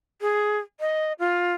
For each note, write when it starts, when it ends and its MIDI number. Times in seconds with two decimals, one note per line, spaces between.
0.21 0.57 68
0.80 1.13 75
1.19 1.54 65